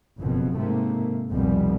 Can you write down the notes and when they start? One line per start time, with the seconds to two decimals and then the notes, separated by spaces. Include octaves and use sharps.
0.19 F#1 F2 B2
0.57 G#2 C3 A3 A#3
1.31 F1 C2 F2 B2 G3